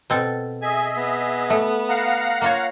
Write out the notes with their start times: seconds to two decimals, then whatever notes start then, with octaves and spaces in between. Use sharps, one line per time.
0.10 B2 C4 A4
0.62 G#4 D#5 E5 G#5
0.97 B3
1.50 A3
1.89 F5 F#5 A#5
2.42 A#3 F4 C#5